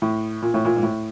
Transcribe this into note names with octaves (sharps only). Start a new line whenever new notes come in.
A2
A#2
A2
A#2
G#2
A2